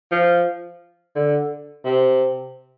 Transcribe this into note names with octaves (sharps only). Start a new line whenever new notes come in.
F3
D3
C3